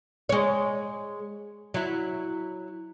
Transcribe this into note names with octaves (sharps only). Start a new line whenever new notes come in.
G#3 C#5
F#3 E4